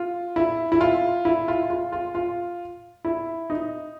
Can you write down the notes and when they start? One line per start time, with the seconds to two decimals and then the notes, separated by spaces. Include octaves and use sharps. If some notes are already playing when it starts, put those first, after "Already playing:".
Already playing: F4
0.36 E4
0.72 E4
0.81 F4
1.25 E4
1.48 F4
1.70 F4
1.92 F4
2.15 F4
3.05 E4
3.50 D#4